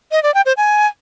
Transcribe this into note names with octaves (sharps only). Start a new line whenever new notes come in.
D#5
D5
G5
C5
G#5